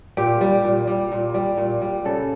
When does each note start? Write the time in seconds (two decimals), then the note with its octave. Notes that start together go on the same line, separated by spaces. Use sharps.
0.17 A#2 G4
0.41 G3
0.65 A#2
0.87 G3
1.12 A#2
1.34 G3
1.58 A#2
1.82 G3
2.05 C#3 A4